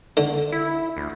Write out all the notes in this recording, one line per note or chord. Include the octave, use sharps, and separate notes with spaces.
D3
E4
D2